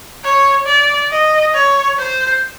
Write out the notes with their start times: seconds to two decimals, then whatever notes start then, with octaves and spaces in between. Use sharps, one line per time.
0.24 C#5
0.66 D5
1.11 D#5
1.54 C#5
1.98 C5